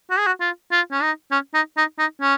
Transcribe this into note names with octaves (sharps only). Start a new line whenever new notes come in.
F#4
G#4
F#4
F4
F4
C#4
D#4
C#4
D#4
D#4
D#4
C#4